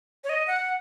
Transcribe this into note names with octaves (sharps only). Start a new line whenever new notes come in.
C#5
D#5
F#5